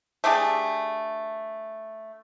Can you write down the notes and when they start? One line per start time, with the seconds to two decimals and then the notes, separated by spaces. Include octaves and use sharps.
0.24 A3 D4 G4 G#4